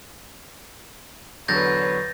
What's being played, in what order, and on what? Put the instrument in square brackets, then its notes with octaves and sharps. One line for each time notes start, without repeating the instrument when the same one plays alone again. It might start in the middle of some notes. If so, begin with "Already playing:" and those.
[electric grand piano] E2 D3 F#3 [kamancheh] B4 C#5 [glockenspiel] G6 A6 A#6